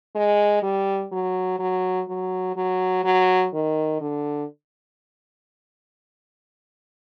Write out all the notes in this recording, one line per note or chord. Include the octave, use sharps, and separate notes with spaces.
G#3
G3
F#3
F#3
F#3
F#3
F#3
D#3
D3